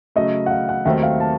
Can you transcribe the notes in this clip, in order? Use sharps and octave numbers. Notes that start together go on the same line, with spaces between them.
C#3 F#3 A3 D#5
F#5
F5
F#5
D#2 D#3 F#3 A3 C4 E5
F5
A5